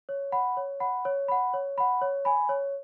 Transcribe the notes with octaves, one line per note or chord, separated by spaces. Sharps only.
C#5
F#5 B5
C#5
F#5 B5
C#5
F#5 B5
C#5
F#5 B5
C#5
G#5 B5
C#5